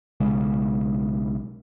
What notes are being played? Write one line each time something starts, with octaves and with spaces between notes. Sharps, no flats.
B1 C#3 G#3